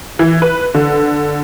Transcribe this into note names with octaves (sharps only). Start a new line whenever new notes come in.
E3
B4
D3